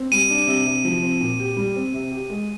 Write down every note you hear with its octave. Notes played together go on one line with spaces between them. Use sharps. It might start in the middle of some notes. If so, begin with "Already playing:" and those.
Already playing: C4
G3 D#7
D4
C3
C3
F3
C4
A#2
G4
G3
C4
C3
G4
G#3